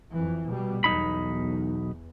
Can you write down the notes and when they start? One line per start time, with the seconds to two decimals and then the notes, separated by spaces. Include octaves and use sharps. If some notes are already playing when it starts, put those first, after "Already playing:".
0.10 F2 E3
0.49 B2 G3
0.84 B1 E2 D#4 B5